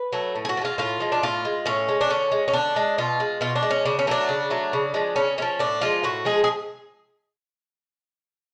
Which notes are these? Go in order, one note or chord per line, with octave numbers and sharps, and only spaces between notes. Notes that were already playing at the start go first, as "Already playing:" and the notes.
Already playing: B4
F#3 A3
A2
G#4
F#4
F3
G#3 F4
A2 F4
F3 G#3
D4
A2 F4
G#3
A2 C#4
G#3
D4
D3 C#4
G#3
C#4
D3 D4
G#3
B2 F4
G#3
B2 F4
D4
G#3
C#4
C#3 D4
C#4
F#3 A3 D4
C#3
F#3 A3
C#3
F3 G#3
C#3 C#4
F3 G#3 C#4
A2 D4
F3 G#3 F4
A2 F#4
F3 G#3 G#4
G#4